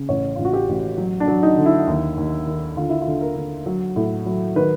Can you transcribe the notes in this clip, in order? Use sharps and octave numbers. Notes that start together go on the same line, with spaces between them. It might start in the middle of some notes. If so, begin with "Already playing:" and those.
Already playing: C#3
A1 C#5
A1 F4
F#4
G4
A1
F#3
D4
F#3
D#4
D3
E4
D#2
D#2
D#3
D3 F4
E4
F4
D3
A#4
D3
F#3
A2
F#3
D#3 B4